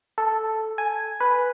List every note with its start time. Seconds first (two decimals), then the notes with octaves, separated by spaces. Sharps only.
0.18 A4
0.78 G#5
1.20 B4